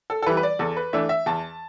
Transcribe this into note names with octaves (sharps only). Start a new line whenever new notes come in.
A4
A4
E3 G3 B4
B4
D5
E2 A4
B4
E3 A3 D4 E5
E5
E2 A5